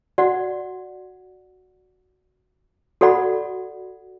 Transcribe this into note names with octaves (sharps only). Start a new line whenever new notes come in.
F#4 D5 F#5
F#4 A4 D5 F#5 B5